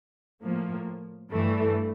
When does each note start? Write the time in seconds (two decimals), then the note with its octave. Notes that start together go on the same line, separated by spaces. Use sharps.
0.42 A2 F3 A#3
1.31 G2 E3 A3